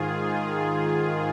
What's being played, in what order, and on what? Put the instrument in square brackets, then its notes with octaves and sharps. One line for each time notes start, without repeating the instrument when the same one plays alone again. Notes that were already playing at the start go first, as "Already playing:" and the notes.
Already playing: [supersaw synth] G#2 D#3 F4 G#4